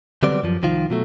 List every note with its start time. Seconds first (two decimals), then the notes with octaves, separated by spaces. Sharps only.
0.23 D3 F#3 G3 B3 C4 D5
0.43 F#2 F3
0.63 C2 D#3 F3 F4
0.90 B2 F#3 A3